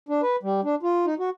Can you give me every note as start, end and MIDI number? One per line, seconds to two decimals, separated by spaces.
0.09 0.21 62
0.22 0.36 71
0.43 0.61 55
0.64 0.75 62
0.83 1.06 65
1.06 1.14 63
1.19 1.30 66